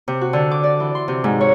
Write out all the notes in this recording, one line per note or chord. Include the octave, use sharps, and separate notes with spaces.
C3
F#4
D3
D6
D5
E3
C6
C3
G#2
C#5